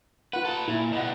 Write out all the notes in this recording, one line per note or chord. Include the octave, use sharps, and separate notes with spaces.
F4 B4 F#5
A4 B4
A#2 E4
B2 G3 D#5 F#5